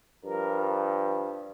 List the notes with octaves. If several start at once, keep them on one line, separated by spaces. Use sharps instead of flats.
G2 F3 A#4